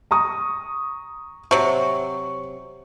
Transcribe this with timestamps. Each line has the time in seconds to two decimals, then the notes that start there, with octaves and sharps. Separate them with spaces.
0.11 A#5 C#6 D#6
1.51 C3 F#3 C#6